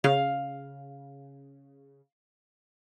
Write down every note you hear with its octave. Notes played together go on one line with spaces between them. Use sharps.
C#3 F5